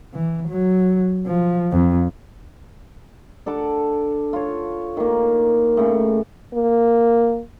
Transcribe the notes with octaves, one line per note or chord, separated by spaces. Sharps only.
E3
F#3
F3
F2
D4 A4 F#5 D6
F4 C#5
D#3 A#3
A2 C#3
A#3